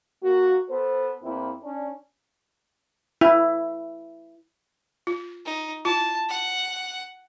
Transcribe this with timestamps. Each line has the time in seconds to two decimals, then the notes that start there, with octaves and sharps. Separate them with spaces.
0.23 A#3 F#4
0.69 B3 A4 C5
1.23 E2 A#3 C4 E4
1.63 C#4 D4
3.21 E4
5.07 F4
5.45 D#4
5.85 E4 F4 A5
6.29 F#5